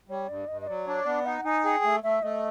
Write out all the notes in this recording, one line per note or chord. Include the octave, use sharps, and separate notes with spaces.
G3 C#5
G2 D5
G2 D#5
D#5
F#3 D5
D4 C#5
B3 D5
D#4 F#5
D#4 G#5
G#4 G5
A3
A3 E5
A3 D#5